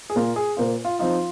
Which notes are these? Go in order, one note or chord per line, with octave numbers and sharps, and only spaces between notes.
G#4
A#2 A#3 F4 A#4
G#4
A#2 A#3 F4 C5
F4
F3 C4 D#4 F4